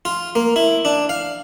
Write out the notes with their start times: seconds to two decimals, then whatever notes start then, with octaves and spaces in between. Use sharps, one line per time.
0.05 F4
0.35 A#3
0.56 E4
0.85 D4
1.09 F5